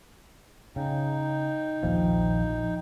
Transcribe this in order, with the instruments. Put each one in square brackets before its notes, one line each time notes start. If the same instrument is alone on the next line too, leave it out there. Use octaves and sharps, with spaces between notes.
[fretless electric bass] C#3 [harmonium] D#4 G5
[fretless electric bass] A#1 D#2 F3